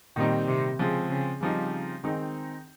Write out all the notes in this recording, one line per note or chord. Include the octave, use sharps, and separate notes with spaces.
A#2 D#3 G3 C4 D#4
C3
C#3 F3 G#3 C4
C#3
C#3 F3 G3 C4 D#4
D#3 G#3 C4 D#4